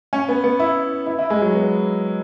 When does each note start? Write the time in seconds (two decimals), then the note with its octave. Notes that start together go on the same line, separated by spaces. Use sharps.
0.13 C#4
0.29 B3
0.44 B3
0.60 E4
1.06 E4
1.19 E4
1.30 G#3
1.42 F#3
1.55 B3